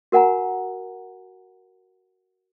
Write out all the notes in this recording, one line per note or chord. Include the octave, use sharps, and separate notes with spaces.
F#4 A#4 F#5 G#5 A#5